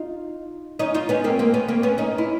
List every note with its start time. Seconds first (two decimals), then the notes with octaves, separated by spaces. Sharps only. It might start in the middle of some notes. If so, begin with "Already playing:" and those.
Already playing: D#4 F4
0.79 C#4 D#4
0.94 D#4 F4
1.09 B3 C#4
1.24 A#3 C4
1.39 A#3 C4
1.54 B3 C#4
1.68 A#3 C4
1.83 B3 C#4
1.98 C#4 D#4
2.18 E4